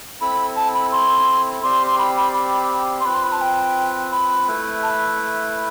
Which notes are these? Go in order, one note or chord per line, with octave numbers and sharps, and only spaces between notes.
C4 E4 A4 B5
A5
B5
C6
C4 G4 D5 F5 C6
C6
B5
B5
B5
C6
C4 F4 B4 B5
C6
B5
A5
G5
B5
A3 E4 B4
A5